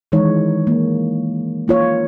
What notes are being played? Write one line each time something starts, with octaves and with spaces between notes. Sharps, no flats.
D#3 E3 G#3 D#4 C#5
A#3
A#3 F4 C#5